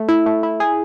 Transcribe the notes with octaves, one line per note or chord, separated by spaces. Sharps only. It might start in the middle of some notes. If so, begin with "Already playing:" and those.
Already playing: A3
E4
A3
E4
G#4